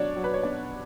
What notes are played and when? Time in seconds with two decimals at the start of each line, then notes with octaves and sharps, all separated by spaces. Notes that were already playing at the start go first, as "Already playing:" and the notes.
Already playing: B2 F#3 D4 C#5 D5
0.16 F#3
0.24 B4
0.34 C#5
0.43 B2 D4 D5